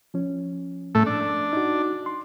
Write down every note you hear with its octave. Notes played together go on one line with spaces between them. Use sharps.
F3 C#4
A2 A3
D4
D#4 F#4
C6